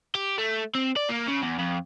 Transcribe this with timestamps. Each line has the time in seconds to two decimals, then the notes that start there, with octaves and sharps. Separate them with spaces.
0.15 G4
0.38 A3
0.75 C4
0.97 D5
1.09 A#3
1.28 C#3
1.42 E2
1.59 F2